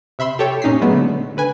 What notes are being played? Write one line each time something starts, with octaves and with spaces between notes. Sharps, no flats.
C3 E5 B5 C6 E6
G4 A4 C#5 G5
A#2 C#4 D#4 B6 C7
F#3 G#3 A3 B3
D3
D3 B4 G#5